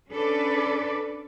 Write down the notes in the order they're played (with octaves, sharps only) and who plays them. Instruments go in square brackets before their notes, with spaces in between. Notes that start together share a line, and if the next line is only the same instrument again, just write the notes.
[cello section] C#4 D4 A4 B4 D5